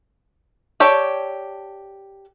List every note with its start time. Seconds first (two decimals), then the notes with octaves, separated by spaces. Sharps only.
0.80 G4 A4 C#5 D5 A5